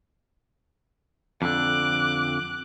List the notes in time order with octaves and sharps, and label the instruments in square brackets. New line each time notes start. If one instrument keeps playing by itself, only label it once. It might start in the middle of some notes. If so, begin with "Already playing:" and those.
[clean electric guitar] F2 D3 [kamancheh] D6 F#6